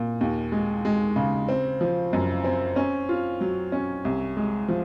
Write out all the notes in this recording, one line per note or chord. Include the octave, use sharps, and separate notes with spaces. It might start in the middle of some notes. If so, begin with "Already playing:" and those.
Already playing: A#2
D#2
G#3
G#3
C#3
C4
F3
F#2
C4
C#4
F4
F#3
C#4
C2
G#3
F3